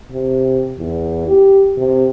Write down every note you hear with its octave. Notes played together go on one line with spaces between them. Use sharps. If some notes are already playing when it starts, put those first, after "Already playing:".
C3
E2
G4
C3